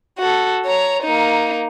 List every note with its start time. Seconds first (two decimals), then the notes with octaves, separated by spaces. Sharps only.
0.19 F#4 A4
0.66 C#5 A#5
1.03 A#3 D#4